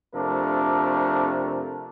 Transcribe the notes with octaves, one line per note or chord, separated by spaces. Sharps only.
F2 C3 A3 D4 A#4